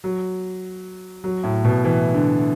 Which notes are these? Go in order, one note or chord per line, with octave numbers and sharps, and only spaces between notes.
F#3
F#3
A2
B2
E3
D3